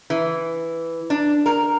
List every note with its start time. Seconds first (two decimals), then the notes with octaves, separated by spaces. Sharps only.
0.10 E3
1.10 D4
1.46 A#4